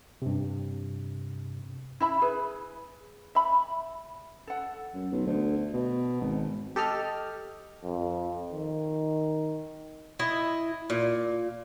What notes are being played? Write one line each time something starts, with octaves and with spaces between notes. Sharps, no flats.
G2 C3
E4 E5 B5
G#4 B4
E5 B5
A4 F#5
F#2
B1
D2
B2
G#1
G4 A4 D#5 F6
F2
D#3
E4 D#5
A#2